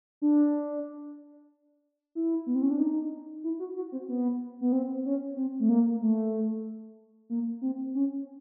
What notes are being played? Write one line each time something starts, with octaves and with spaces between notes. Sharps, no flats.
D4
E4
B3
C4
C#4
D4
D#4
E4
F#4
F#4
C4
B3
B3
C4
C#4
C4
A3
A#3
A3
A#3
C4
C#4